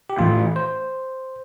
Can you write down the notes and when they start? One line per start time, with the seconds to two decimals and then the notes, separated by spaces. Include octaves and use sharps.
0.10 G4
0.19 A2 E3 A3 F4
0.56 C5